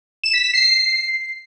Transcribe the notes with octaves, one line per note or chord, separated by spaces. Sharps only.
E7
B6
B6
C7